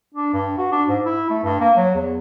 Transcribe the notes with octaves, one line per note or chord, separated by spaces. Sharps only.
D4
G2
F#4
D4
G#2
E4
A3
G2
A#3
F#3
E2